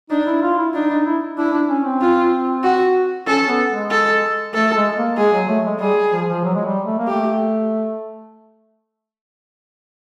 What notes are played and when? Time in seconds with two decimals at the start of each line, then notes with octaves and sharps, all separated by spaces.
0.10 D4 D#4
0.27 E4
0.43 F4
0.58 E4
0.74 D4 D#4
0.91 D#4
1.06 E4
1.37 D4 E4
1.53 D4
1.69 C#4
1.85 C4
2.01 F4
2.64 F#4
3.27 C#4 A4
3.48 B3
3.70 G#3
3.91 A4
4.54 A3 A4
4.76 G#3
4.97 A#3
5.17 G#3 G#4
5.33 F#3
5.48 A3
5.66 G#3
5.80 G3 G#4
6.12 F3
6.29 F3
6.44 F#3
6.55 G#3
6.66 G3
6.86 A3
6.98 A#3
7.07 A3 G4